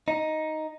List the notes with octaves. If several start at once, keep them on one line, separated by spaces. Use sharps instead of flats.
D#4